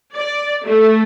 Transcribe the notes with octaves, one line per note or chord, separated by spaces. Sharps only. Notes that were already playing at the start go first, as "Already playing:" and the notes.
D5
A3